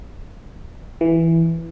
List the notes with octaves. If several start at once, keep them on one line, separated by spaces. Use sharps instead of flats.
E3